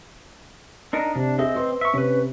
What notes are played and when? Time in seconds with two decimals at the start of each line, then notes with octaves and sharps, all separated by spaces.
0.93 D4 D#4 A#4
1.15 C3 D4
1.39 C4 G#4 D#5 E5
1.55 B4 C5 C6
1.81 E5 C#6
1.94 C3 C#4 B4